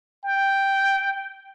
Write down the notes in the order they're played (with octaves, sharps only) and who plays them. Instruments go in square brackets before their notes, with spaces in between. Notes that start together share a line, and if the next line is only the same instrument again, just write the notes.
[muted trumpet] G5